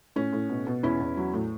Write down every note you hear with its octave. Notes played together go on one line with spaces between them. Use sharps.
A2 C#4
A2
B2
B2
E2 C#4 E4
E2
F#3
A2